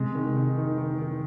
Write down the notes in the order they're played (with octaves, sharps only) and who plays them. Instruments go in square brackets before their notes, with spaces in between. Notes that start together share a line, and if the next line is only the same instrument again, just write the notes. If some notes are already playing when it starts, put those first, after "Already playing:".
Already playing: [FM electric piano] C3 [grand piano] G#3
[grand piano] D#3
D#4
D#3
D#3
D#3